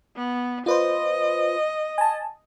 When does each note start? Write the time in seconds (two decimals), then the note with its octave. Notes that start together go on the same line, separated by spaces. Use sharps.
0.16 B3
0.66 F4 B4 C5 D#5
1.98 G#5 A5